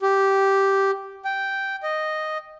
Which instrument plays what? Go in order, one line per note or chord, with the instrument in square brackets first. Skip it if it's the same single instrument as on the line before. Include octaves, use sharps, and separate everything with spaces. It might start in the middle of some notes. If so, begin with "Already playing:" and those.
[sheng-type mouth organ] G4
G5
D#5